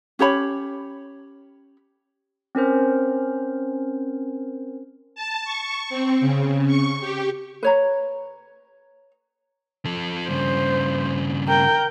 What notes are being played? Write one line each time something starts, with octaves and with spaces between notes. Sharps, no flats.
C#4 G4 C#5 B5
C4 C#4 A#4 C5
A5
C#6
C4
C#3
C#6
G4
B4 C#5 A#5
F3 A4
G2 C#3 C5
A#4 G5